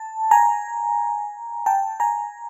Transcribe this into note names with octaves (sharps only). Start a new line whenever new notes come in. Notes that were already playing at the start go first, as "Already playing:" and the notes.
Already playing: A5
G#5 A#5
G5 A5
G#5 A#5